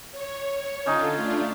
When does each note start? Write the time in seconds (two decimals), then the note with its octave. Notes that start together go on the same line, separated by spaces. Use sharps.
0.12 C#5
0.86 D3 C#4 D#4 F4 A4
1.14 A3 D4 F4